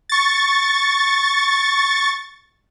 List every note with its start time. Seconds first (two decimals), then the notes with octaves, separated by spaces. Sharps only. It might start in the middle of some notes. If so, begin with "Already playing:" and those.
0.09 C#6 A6